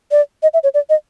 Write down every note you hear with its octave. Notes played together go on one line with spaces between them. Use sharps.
D5
D#5
E5
C#5
D5
D#5